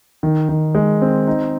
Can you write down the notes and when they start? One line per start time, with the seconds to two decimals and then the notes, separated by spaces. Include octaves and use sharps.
0.23 D#3
0.49 D#3
0.75 G#3
1.02 C4
1.28 D#4